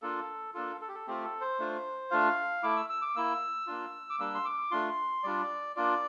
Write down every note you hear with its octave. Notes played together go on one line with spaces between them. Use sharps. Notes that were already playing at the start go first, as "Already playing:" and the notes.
A#3 D4 F4 A4
A#3 D4 F4 A4
A4
G4
A4
A3 C4 F4 G4
A4
C5
A3 D4 F4
A3 D4 F4 F5
A3 E4 D6
E6
E6
D6
A#3 E4 E6
A#3 D4 F4
D6
G3 A#3 D4 E6
C6
D6
A3 D4 F4 C6
G3 D4 F4 D5
A#3 D4 F4 D5